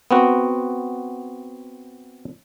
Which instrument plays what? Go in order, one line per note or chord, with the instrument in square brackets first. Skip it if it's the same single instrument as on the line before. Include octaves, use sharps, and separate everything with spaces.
[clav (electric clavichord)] B3 C4 F#4